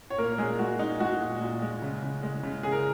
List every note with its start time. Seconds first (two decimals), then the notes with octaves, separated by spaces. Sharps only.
0.10 C#5
0.18 A#2 A#3 A#4
0.38 A#2 G#3 G#4
0.59 G#3 F#4
0.79 G#3 D#4
1.00 G#3 F#4
1.20 A#2
1.41 A#2
1.62 G#3
1.82 C#3
2.02 C#3
2.23 G#3
2.43 C#3
2.63 C#3 G#4
2.72 A#4